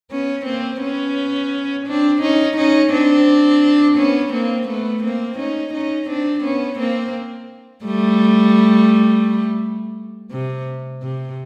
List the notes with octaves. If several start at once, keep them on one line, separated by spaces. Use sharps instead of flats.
B3 C#4
A#3 C4
B3 C#4
C4 D4
C#4 D#4
C#4 D#4
C4 D4
B3 C#4
A#3 C4
A3 B3
A#3 C4
C#4 D#4
C#4 D#4
C4 D4
B3 C#4
A#3 C4
G3 A3
C3
C3